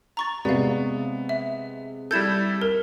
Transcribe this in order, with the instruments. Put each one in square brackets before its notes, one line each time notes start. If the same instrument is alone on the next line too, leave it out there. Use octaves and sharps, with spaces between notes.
[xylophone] A#5 C#6 A6
[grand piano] C3 G#3 [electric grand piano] B3 [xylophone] D5 F5
[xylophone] E5
[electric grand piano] G3 E4 A4 [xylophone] G6 G#6 E7
[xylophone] A#4 [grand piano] F6